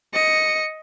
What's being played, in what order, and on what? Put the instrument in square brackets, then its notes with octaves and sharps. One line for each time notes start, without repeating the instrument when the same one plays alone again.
[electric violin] D#5 C#7